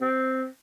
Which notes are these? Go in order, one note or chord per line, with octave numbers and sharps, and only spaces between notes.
C4